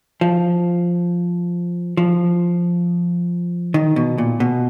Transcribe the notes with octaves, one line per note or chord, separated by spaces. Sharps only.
F3
F3
D#3
B2
A#2
B2